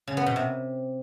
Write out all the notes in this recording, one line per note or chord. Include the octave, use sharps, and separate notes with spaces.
C#3
B3
B2
C3